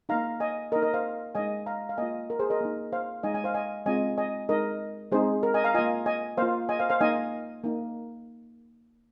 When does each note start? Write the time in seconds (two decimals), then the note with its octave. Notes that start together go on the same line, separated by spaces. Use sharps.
0.09 A#3 D#4 F5 A#5
0.40 D#5 G#5
0.72 A#3 D#4 A#4 D#5
0.82 A#4 D#5
0.94 C5 F5
1.35 G#3 D#4 D#5 G#5
1.66 F5 A#5
1.89 F5
1.97 A#3 F4 D#5 G#5
2.30 A#4
2.39 G#4 C5
2.50 A#4 D#5
2.61 A#3 D#4
2.93 C5 F5
3.23 G#3 D#4 D#5 G#5
3.34 D#5 G#5
3.44 C5 F5
3.54 D#5 G#5
3.86 G#3 C4 F4 D#5 G#5
4.18 D#5 G#5
4.49 G#3 D#4 A#4 D#5
5.12 G#3 C4 D#4 G#4 C5
5.43 A#4
5.54 D#5 G#5
5.64 F5 A#5
5.74 A#3 F4 D#5 G#5
6.06 D#5 G#5
6.37 A#3 F4 C5 F5
6.69 D#5 G#5
6.79 C5 F5
6.90 C5 F5
7.00 A#3 D#4 D#5 G#5
7.64 A#3 D#4